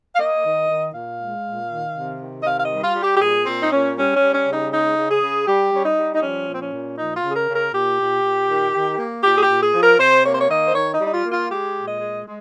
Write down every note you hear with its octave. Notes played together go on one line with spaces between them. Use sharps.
F5
A#3 D#5
D#3
D#3
A#2 F5
G#3
A#2
D#3
C3
D#3
D#5
C3 F5
F5
D#5
G3
F4
G3
G4
G4
A#2 G#4
A#2 C4
D#4
A#2 C#4
G3 C#4
C#4
G3
C#4
C#3
D#4
G#3 D#4
C#3
G#4
C#3
G3 G4
G3 C#4
D#4
G3
D#4
F3 C#4
A#2
C4
C#4
A#2
F3 D#4
F4
C#3
G#4
A#4
C#3
A#4
A#2 G4
A#2
A#2
D#3
D#3
A#3
A#2 G4
G#4
G4
A#2
G#4
F3
A#4
C3 C5
A#3 C#5
C5
C#5
D#3 D#5
C5
D#3 C#5
D#4
G3
D#4
F4
A#3
F4
G#3 G4
A#2
D#5
G#3
G#3